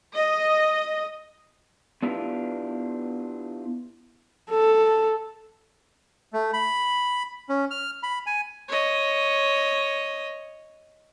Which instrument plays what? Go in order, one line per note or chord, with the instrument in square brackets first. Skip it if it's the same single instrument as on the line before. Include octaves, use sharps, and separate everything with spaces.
[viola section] D#5
[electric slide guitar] B3 D4 E4 F4 G4 B4
[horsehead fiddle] A4
[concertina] A3
B5
C#4
F6
B5
G#5
[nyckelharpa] C#5 D#5